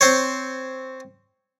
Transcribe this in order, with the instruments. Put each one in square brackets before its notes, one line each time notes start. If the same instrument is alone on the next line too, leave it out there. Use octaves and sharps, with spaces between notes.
[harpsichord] C4 C5 C#5